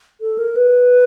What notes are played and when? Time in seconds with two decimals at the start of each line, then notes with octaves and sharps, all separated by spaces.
0.21 A4
0.38 A#4
0.56 B4